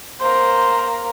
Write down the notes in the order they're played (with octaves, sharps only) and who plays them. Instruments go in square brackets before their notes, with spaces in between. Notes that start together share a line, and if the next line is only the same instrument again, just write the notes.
[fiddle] A#3 A#4 [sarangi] C5